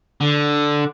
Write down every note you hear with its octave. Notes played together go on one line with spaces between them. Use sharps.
D3